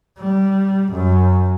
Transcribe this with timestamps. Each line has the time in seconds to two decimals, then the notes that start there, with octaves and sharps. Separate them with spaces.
0.20 G3
0.92 F#2